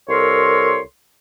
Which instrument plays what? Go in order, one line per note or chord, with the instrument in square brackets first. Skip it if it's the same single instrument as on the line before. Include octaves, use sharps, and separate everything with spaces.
[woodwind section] C2 A4 A#4 C#5 C6